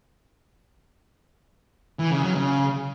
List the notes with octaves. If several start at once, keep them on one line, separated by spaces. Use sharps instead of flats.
E3
C#3
F#3
C#3